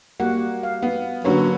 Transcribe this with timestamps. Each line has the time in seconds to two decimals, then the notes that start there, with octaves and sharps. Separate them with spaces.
0.20 G3 A#3 F#4 F#5
0.63 F5
0.82 B3
1.24 D3 F#3 A#3 C#4 D4 B4